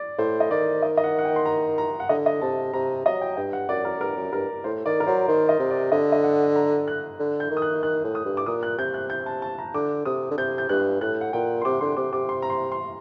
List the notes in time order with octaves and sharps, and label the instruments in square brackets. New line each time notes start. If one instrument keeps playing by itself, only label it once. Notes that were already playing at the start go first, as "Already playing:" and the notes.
Already playing: [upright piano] D5
[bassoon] A2 [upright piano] C5
[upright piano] D#5
[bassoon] D#3 [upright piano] D5
[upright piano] D#5
D#5
F#5
F#5
G5
C6
A#5
A#5
F#5
[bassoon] D3 [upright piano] D#5
[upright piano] D#5
[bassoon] C3 [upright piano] A5
[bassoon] C3 [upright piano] A#5
[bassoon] F#3 [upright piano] D#5
[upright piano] G5
[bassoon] G2 [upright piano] G5
[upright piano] F#5
[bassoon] F#2 [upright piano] D5
[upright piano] A#4
[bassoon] G2 [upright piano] A#4
[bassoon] F#2
[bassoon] G2 [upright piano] A#4
[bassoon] A2 [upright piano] C5
[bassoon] D#3 [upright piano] D5
[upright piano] A#4
[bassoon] F#3 [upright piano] C5
[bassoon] D#3 [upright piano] C5
[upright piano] D#5
[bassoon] C3
[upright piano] D5
[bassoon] D3 [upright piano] D#5
[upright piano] D#5
F#5
A#5
F#6
[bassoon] D3
[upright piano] G6
[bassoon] D#3
[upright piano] D#6
F#6
[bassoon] D#3 [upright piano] F#6
[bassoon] A2
[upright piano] D#6
[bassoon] G2
[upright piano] D6
[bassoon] A#2 [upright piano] D#6
[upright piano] F#6
[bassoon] C3 [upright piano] G6
[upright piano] F#6
G6
A5
A5
A#5
[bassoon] D3 [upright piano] D6
[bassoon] C3 [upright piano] D#6
[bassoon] D3
[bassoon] C3 [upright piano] G6
[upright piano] G6
[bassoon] G2 [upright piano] F#6
[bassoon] A2 [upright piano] F#6
[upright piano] F#5
[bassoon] A#2 [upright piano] G5
[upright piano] C6
[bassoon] C3 [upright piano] D6
[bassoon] D3 [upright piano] C6
[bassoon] C3 [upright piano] D6
[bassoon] C3 [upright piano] D6
[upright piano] C6
A#5
C6
C6